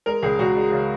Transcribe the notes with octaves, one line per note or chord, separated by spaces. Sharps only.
G#3 A#4
C#2 G#4
C#2 F#4
G#3
C#3